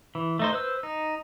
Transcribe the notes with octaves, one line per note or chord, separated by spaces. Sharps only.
E3
A3 D#4 C5
B4 C5 E6
D#4